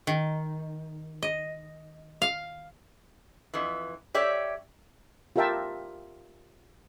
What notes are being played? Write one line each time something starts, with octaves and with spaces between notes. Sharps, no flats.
D#3
D#5
F5
F2 E3
G4 C#5 D5 E5
F4 G4 A#4 E5 G5 A5